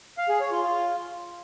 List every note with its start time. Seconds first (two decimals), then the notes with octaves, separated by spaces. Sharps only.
0.18 F5
0.29 G#4
0.40 C#5
0.51 F4
0.63 F4